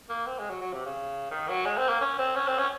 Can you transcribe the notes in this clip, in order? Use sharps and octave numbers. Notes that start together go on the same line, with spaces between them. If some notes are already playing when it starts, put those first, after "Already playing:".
A#3
C4
G#3
F#3
F#3
C3
C#3
D#3
F#3
G#3
C4
A#3
C#4
C4
C#4
C4
C#4